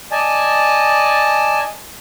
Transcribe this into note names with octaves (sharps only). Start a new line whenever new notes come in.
D5 D#5 G#5 A5